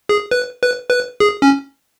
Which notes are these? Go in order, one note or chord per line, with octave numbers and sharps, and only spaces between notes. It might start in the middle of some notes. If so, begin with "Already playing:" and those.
G#4
B4
B4
B4
G#4
C#4